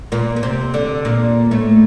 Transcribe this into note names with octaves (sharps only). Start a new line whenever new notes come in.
A#2 A#3
A#3
C3 C4
D3 D4
A#2 A#3
A2 A3